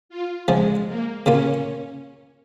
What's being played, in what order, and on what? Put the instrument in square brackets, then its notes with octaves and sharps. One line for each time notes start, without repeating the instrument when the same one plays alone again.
[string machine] F4
[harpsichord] C#2 C#3 F3 [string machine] G#3
[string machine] A#3
[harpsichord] C#3 A#3 F4 [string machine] C#4